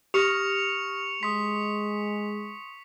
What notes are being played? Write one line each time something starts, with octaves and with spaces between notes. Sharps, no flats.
G4 C#6 D#6 F6 A#6 C#7 F7
G#3 C6 D#6 B6